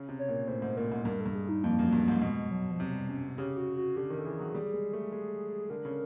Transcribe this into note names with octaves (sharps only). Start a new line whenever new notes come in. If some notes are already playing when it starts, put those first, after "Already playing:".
Already playing: C#3
C3
C#5
A#2
A2 C5
G#2
A#2 A#4
G#2
G2 A#4
A4
G2
G#4
D#4
F2 A#3
F#2
G2
G#2
B2 G#3
F#3
F3
C3 F#3
G3
C#4
C#3 G4
F#4
F#4
D3 G4
D#3
A4
E3 G#4
F#3
G3
G#3
A3
G#3
D3 A#4
C#3